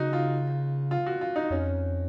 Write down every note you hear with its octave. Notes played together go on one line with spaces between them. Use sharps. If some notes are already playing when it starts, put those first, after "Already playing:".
Already playing: C#3 D#4 F#4
F4
F4
F#4
F4
D#4
F2 C#4